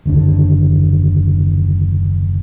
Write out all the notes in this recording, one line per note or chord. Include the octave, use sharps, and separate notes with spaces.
F#1 D#2 D3 D4